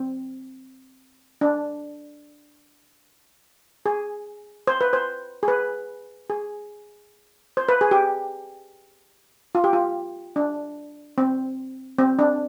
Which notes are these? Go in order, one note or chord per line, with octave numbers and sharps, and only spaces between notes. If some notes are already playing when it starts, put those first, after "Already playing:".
Already playing: C4
D4
G#4
C5
B4
C5
G#4
B4
G#4
C5
B4
G#4
G4
F4
G4
F4
D4
C4
C4
D4